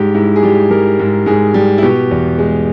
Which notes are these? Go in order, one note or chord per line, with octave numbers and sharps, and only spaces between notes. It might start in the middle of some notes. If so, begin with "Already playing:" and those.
Already playing: G#2 G3 G4
G#2 E4
G#4
G3 G4
G3 A#4
G#2
G#2 G#4
G3
E4
B2 G4
E2
G#3